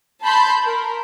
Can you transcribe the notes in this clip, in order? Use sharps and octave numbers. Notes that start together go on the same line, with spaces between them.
A5 B5 C6 G6
A#4